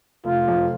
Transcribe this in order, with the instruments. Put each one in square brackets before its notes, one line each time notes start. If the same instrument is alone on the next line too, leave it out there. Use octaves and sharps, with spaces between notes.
[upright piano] F1 [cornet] F4
[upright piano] F2